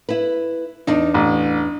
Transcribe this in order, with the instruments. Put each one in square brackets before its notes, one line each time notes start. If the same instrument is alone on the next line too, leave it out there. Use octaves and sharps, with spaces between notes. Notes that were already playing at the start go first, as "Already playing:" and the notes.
[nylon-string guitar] E4 B4
[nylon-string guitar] E2 D4 [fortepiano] D#4
[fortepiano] A1